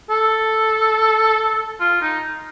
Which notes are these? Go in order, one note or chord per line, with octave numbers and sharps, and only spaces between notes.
A4
F4
D#4